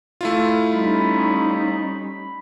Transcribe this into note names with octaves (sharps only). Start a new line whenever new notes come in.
A3 E4 F4
G3 C#4 D#4 B5